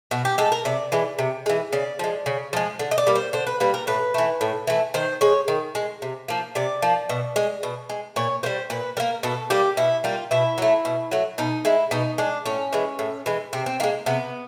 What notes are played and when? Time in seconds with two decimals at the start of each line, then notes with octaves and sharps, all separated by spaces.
0.11 B2 F#4
0.25 G4
0.38 G#3 A4
0.52 A#4
0.65 C3 D5
0.92 E3 G#3
1.19 C3
1.46 E3 G#3
1.73 C#3 D5
1.99 F3 G#3
2.26 C#3
2.53 F3 G#3
2.79 D3
2.91 D#5
2.98 D5
3.07 G3 A#3
3.16 C5
3.33 D3 C5
3.47 B4
3.60 G3 A#3 B4
3.74 A#4
3.87 A2 B4
4.14 E3 A3
4.41 A2
4.67 E3 A3
4.94 D#3 C5
5.21 G#3 C#5
5.48 D#3
5.75 G#3
6.02 C3
6.28 F3 A#3
6.55 C3 D5
6.82 F3 A#3
7.09 B2
7.36 G#3
7.63 B2
7.89 G#3
8.16 A#2 C#5
8.43 G3 A#3 C5
8.70 A#2 B4
8.97 G3 A#3 A#4
9.23 B2 A4
9.50 G3 A#3 G4
9.77 B2 E4
10.04 G3 A#3 F4
10.31 B2 E4
10.58 F#3 A3
10.85 B2
11.11 F#3 A3
11.38 B2 D#4
11.65 G#3 E4
11.91 B2 D#4
12.18 G#3 D4
12.45 A2 C#4
12.73 E3 G#3
12.99 A2
13.26 E3 G#3
13.53 C3 C4
13.66 C4
13.80 D#3 G#3 A#3
14.06 C3 B3